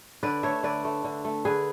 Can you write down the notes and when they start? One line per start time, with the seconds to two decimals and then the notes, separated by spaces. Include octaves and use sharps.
0.23 D3 B4 D5
0.43 A3 C#5 E5
0.63 D3 B4 D5
0.85 A3
1.04 D3
1.25 A3
1.45 D3 G#4 B4